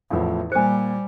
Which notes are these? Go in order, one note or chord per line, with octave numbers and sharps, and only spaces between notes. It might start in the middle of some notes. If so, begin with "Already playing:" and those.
A1 E2 A2 F3
A#2 G3 C5 G#5 C#7